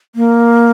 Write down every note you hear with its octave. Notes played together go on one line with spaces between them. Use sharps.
A#3